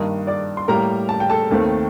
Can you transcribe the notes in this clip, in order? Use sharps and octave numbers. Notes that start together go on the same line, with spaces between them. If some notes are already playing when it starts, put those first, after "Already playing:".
Already playing: G2 D#3 A#3 D#5 D#6
D5 D6
C6
A2 G3 A#3 A#4 A#5
A5
G5
A4 A5
D#2 D#3 A3 C4